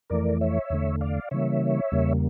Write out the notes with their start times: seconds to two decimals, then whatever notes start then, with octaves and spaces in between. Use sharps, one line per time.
0.10 F2 E3 A3 A#4 D5
0.41 C#5 E5
0.70 E2 D3 A3
1.01 D5 F5
1.31 C#3 E3 G3 A#3 C#5 E5
1.92 E2 C#3 G3 A#3